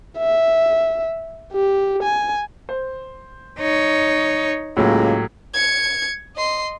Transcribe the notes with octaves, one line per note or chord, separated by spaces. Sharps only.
E5
G4
G#5
C5
D#4 C#5
C#2 A2 F#3 A#3 G4
G#6 C#7
D#5 C6